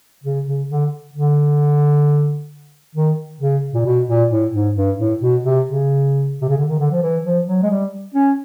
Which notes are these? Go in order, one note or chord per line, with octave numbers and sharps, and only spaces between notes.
C#3
C#3
D3
D3
D#3
C#3
A#2
B2
A#2
A2
G#2
G2
A2
B2
C3
C#3
C3
C#3
D3
D#3
D3
F3
E3
F3
F#3
G#3
G3
C#4